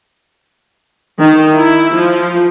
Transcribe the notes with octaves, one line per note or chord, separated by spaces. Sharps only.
D#3
E4
F3